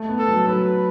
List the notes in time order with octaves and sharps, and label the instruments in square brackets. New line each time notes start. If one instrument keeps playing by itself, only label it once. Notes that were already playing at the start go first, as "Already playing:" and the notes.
Already playing: [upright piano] A3
B3
[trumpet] A4
[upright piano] F#3
[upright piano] F#3 [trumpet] B4